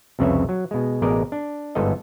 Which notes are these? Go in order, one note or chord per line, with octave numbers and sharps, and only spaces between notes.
C2 F2 C#3 B4 C#5 E5
F#3
B2 G#3
A1 B2 G#3 A#4 D5 D#5
D4
G1 G#2 G3 B3 A4 D#5